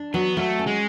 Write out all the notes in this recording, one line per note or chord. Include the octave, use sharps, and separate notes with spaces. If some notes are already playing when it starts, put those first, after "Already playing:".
Already playing: D4
F#3 B3
F#3 A3
C#4
G#3